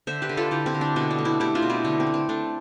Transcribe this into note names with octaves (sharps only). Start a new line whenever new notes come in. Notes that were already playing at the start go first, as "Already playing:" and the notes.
D3 C5 E5
G4 B4
D3
F4 A4
D3 E4 G4
C4 E4
D3
D4
B2 D4
D4
A3
C4 E4
A3 E4 G4
D4 F4
B2
C4 E4
D3 D4
C4
A3
C4
A3 D4